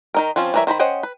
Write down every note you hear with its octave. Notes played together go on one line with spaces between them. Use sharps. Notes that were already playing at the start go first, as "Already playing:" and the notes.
D#3 D#4 A#4
F3 C4 C#4 F4
E3 G3 A#4 C#5 E5
D#3 C5 A#5 B5
C#4 C5 D#5 F#5 G5
B4